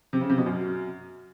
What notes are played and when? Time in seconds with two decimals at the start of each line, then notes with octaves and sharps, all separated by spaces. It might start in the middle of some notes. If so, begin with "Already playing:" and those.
0.13 C3
0.21 C#3
0.30 C3
0.38 B2
0.46 F#2